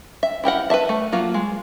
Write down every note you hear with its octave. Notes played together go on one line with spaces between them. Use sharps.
E5
E4 G4 A#4 F#5
B4 C5 E5 A5
A3
F#3 A#3 F4
G#3